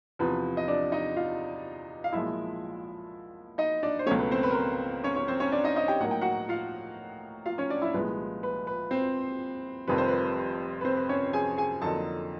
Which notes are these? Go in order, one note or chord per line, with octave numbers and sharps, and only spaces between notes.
E2 C3 F3 B4
D#5
D4 D5
D#4 D#5
F4 F5
F5
B1 A#2 F3 G#3 E4 E5
D#4 D#5
D4 D5
C5
C#2 B2 F#3 A3 C#4 C#5
B4
C4 C5
B4
A#4
B4
C#4 C#5
C#4 C#5
C4 C5
C#4 C#5
D4 D5
D#4 D#5
D#4 D#5
G4 G5
A2 F#3 A#3 D#4 F#5
G5
F#4 F#5
F4 F5
F4 F5
C#4 C#5
D4 D5
E4 E5
C2 A#2 F3 G#3 B4
B4
B4
C4 C5
F1 F2 C3 D#3 G3 B4
C5
B4
B4
C4 C5
B4
C#4 C#5
G#4 G#5
G#4 G#5
F2 D3 F#3 A#3 D#4 A4 A5